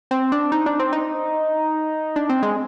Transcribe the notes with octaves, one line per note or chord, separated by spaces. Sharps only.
C4
D4
D#4
D4
C4
D#4
D4
C4
G#3